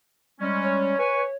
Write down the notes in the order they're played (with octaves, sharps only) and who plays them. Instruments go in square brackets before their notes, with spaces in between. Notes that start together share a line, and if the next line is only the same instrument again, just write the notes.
[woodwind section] G3 G#3 C#4
[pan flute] C#5
[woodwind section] B4 G#5 C#6